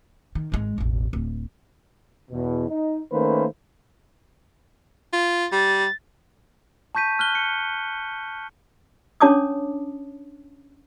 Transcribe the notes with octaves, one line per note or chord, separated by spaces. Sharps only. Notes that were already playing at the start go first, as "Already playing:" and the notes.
D#3
G#1 G#3
E1 A1
D1
E2 B2
D#4
D#3 A3 A#3 C#4 B4 C5
F4
G3 A6
A5 C#6 G6 B6 D#7
F6 F#6 G7
C#7
C#4 D4 C#5 A5 D6 D#6